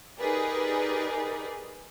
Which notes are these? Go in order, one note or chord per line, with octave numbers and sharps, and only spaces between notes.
D#4 G4 G#4 A#4 B4 D5